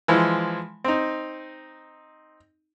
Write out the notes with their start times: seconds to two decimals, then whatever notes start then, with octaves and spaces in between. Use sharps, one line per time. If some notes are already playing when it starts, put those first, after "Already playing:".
0.08 E3 F3 G#3
0.84 C4 D#4